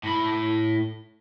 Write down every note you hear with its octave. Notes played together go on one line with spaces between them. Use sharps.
A2 B5